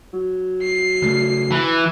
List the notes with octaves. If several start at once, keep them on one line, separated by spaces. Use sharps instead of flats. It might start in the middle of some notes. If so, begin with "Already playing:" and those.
F#3
C7
C#3 A3
E3